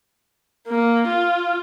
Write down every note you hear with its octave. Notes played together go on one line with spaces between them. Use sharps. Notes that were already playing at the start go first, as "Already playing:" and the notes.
A#3
F4